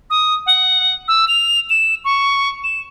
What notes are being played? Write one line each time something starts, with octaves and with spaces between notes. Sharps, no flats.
D#6
F#5
E6
F7
E7
C#6
E7